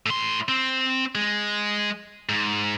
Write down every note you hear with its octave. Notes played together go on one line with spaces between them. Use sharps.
A2 C6
C4
G#3
G#2